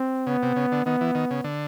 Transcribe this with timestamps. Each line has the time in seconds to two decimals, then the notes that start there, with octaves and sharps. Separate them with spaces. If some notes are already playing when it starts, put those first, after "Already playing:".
Already playing: C4
0.27 C#3 B3
0.43 C3
0.56 C#3
0.72 D3
0.86 D#3 B3
1.01 E3
1.15 D#3
1.31 C#3
1.44 D3